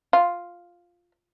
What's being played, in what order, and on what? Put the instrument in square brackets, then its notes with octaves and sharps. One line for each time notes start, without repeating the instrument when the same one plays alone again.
[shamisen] F4